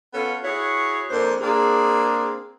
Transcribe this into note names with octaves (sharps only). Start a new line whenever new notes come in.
B3 C#4 F4 A4
E4 F#4 G#4 C#5
F2 A#3 D4 A#4 C5
A#3 C4 D4 G#4